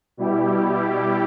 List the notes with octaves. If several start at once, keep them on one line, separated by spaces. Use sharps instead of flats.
B2 G3 E4 G4